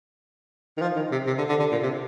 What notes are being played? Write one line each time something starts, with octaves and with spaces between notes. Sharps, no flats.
D#3
F3
D#3
C3
C3
D3
D3
D3
A#2
C3